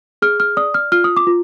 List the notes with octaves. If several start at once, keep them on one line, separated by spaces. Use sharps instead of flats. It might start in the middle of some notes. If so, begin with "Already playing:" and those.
G#4 F6
F6
D5 D#6
F6
F4 F6
D#6
D6
F4